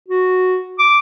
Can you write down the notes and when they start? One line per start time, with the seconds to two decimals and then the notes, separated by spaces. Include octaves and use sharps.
0.08 F#4
0.79 D6